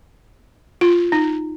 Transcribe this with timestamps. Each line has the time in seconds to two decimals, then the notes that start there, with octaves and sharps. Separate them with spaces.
0.81 F4
1.12 D#4